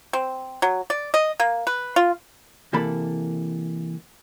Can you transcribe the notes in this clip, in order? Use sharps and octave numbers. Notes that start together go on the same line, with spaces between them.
C4
F#3
D5
D#5
A#3
B4
F4
C3 E3 A#3 A4 B5